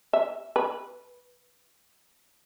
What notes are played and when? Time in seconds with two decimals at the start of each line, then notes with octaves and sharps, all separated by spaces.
0.13 E5
0.56 B4